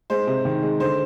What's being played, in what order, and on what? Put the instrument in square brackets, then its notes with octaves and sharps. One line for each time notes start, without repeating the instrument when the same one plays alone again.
[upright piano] G#3 C5
C3
D#3
G#3
D3 C5